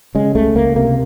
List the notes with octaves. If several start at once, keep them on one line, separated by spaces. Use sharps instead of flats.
C#3 G#3
C#2 A3
C#2 A#3
C3 A#3